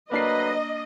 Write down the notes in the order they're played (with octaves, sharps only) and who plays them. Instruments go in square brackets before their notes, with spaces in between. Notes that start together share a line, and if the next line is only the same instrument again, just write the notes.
[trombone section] D2 F#3 B4 [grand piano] A#3 D4 C7 [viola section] D#5